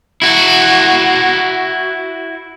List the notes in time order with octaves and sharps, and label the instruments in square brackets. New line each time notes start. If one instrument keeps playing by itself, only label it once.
[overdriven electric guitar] E4 F#4